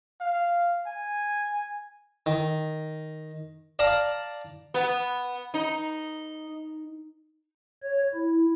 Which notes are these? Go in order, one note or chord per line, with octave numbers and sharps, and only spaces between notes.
F5
G#5
D#3
D5 F5 A5 A#5
B3
D#4
C#5
E4